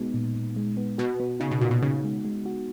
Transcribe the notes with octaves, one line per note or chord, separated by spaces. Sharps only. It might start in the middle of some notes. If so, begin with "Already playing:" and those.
Already playing: B2 G#3 B3 D#4
A#2
A#2
G#3
B3
B2 F#4
B3
C#3 D#4
B2
A#2 F#4
B2
C#3 D#4
G#3
G#3
F#4